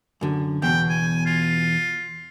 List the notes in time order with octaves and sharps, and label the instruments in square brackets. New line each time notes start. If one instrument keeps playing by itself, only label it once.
[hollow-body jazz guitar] F#2 D3
[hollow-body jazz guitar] E2 B2 [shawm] G5
[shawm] G#5
F4